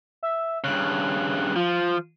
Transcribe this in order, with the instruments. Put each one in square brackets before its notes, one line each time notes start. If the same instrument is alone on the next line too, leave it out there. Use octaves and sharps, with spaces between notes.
[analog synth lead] E5
[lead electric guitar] G2 C#3 [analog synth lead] F#6
[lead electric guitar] F3 [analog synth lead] F4